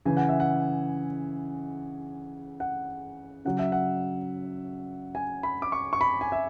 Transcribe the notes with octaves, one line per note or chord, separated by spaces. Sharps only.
C#3 E3 G#5
F#5
E5
F#5
F#5
C#3 F#3 F#5
E5
F#5
G#5
B5
D6
C#6
C#6
B5
G#5
E5